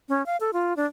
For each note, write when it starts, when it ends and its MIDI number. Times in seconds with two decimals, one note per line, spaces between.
0.09 0.25 61
0.26 0.37 77
0.40 0.51 69
0.53 0.74 65
0.77 0.86 62